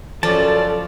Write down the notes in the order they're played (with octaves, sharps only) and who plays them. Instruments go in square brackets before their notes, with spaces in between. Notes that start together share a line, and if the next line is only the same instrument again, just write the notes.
[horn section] F#2 C#4 D5 [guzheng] F3 [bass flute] A4 [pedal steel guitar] A5